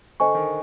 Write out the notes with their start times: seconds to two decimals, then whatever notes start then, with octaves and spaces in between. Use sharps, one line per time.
0.20 D3 C5 D#5 G#5 C#6
0.35 D#3